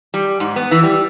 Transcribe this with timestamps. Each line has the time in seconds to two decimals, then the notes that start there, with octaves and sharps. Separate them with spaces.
0.14 G3
0.40 G#2
0.56 B3
0.71 E3
0.83 G3